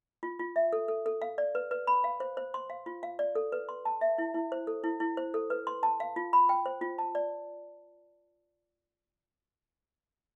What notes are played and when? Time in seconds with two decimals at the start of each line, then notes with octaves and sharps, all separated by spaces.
0.23 F4
0.39 F4
0.56 E5
0.73 A4
0.88 A4
1.06 A4
1.22 F5
1.38 D5
1.55 B4
1.71 B4
1.87 B5
2.04 F5
2.20 C5
2.37 C5
2.54 C6
2.70 F5
2.86 F4
3.03 F5
3.19 D5
3.35 A4
3.52 B4
3.69 C6
3.85 A5
4.01 E5
4.18 E4
4.34 E4
4.52 C5
4.67 A4
4.84 E4
5.00 E4
5.17 C5
5.34 A4
5.50 B4
5.67 C6
5.83 A5
6.00 F5
6.16 F4
6.33 B5
6.49 G5
6.66 C5
6.81 F4
6.98 A5
7.15 D5